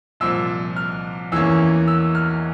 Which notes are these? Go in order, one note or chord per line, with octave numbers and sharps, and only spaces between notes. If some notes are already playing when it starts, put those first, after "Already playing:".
C2 A#2 F3 E6
F6
E2 E3 A#3 C#4 E6
E6
F6